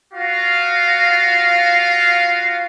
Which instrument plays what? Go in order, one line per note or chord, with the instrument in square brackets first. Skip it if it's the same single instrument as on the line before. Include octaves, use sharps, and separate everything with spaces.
[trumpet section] F4 F#4 F5